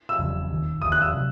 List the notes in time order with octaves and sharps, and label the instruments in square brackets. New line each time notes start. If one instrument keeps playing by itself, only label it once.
[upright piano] E6
[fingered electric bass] E1 E2 C#3 F#3
E1 D#2 D#3
[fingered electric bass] E1 [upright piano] D#6
[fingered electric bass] D#2 D#3
[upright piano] F#6
E6
[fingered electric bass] C3 F#3